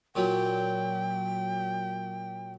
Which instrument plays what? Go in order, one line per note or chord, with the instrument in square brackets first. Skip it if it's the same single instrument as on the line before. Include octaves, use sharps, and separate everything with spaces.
[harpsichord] A#2 F#3 [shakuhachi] G5